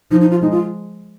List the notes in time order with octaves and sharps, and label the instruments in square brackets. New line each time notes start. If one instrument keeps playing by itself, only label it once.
[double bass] F3 [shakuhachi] D#4
[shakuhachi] D#4
F4
[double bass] G#3 [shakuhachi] D#4
[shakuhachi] F4